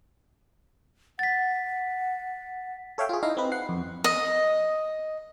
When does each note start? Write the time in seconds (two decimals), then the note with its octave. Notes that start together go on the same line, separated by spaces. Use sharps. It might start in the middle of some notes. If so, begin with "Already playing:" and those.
1.19 F#5 A6 B6
2.98 A4 C#5 E5 F5 G5
3.09 F4 G#4
3.23 D#4 E4 D#5 F5
3.37 C4 B4
3.52 F#5 C7
3.69 F2
4.04 D#5